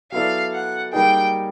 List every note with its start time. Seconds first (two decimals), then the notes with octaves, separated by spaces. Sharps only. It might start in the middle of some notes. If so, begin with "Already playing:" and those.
0.12 F#3 B3 E4 A4 D5 F5
0.53 F#5
0.93 G3 A#3 D#4 G#4 G5